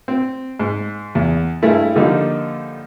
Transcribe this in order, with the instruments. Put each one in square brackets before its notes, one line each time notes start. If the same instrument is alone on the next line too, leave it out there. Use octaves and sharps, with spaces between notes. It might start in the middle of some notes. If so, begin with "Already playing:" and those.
[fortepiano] C4
G#2
E2
G2 G#3 A3 E4
D3 F3 G3 A#3 D#4